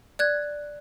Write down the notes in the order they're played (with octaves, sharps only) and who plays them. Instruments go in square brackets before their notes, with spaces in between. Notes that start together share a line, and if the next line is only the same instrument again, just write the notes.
[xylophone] D5 F#6 G#6